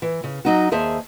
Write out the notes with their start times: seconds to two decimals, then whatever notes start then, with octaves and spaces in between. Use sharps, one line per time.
0.02 E3
0.24 C#3
0.45 F#3 D#4 F#4
0.71 D#2 G#4 C5 E5 A5